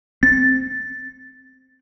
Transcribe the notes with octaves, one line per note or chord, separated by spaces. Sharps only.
C4 A6